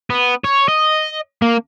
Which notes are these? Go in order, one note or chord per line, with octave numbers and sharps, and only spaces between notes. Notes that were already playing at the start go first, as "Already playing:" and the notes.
B3
C#5
D#5
A#3